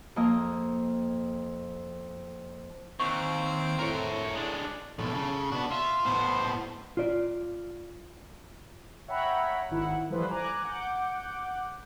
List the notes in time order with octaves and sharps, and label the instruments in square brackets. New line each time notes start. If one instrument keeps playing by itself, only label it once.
[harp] F2 A#3 D#5
[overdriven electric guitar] D#2 [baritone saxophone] C4 [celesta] C#6
[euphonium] A2 [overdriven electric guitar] A#4 C#5
[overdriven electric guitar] G#3 D4
[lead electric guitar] B1 A2 [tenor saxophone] A4
[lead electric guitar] C#3
[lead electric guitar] B3 F#4 [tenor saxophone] D4
[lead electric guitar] F4 [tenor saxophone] E5
[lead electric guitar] A2 B3 [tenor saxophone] C5
[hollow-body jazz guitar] F4 D5
[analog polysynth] C#5 E5 F#5 G5 A#5 B5
G#1 D#3 E4 F#5
E3 F3 G3 A3 B4 C5
G#5 A#5 D6 F#6
F#5 D6 G6